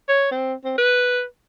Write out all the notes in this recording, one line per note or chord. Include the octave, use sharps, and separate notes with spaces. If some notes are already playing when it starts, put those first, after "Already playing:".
C#5
C4
C4
B4